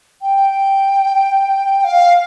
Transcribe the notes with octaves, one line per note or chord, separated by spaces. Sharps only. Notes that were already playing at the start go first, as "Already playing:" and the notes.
G5
F5